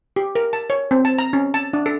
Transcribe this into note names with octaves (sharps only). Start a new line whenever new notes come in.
G4
A#4
A5
C#5
C4
A5
A#5
C#4
A5
D4
A4